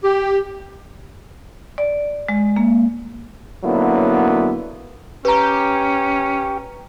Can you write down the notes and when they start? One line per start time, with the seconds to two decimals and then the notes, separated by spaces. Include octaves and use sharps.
0.03 G4
1.78 D5
2.29 G#3
2.56 A#3
3.64 D3 F#3 A#3 B3 C#4 E4
5.25 C#4 G4 B4 A#5